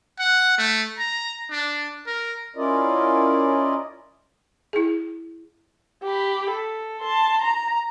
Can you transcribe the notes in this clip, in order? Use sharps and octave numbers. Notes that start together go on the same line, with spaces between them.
F#5
A3
A#5
D4
A#4
C#4 E4 F4 A#4 D5 D#5
E4 G#4
G4 B5
A4
A5 C6
A#5